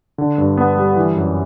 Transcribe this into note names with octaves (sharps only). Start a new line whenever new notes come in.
D3
G2
B3
G3
E3
F#2